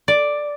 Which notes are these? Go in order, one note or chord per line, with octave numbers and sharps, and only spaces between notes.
D5